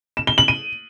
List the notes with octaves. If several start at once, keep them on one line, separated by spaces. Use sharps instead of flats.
E7
G7
F#7
D#7